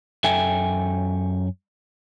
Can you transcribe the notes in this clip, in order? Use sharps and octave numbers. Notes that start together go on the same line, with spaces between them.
F#2 A4 E5 G5 G#5